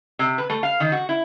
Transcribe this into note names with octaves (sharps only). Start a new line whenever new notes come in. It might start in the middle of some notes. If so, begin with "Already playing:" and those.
C3
B4
A3
F5
D#3
F#4
E4